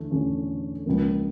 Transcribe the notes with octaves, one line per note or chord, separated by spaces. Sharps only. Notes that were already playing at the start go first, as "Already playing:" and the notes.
Already playing: E2 D3 A3
E2 D3 A3 C#4
C#2 C#3 F3 A#3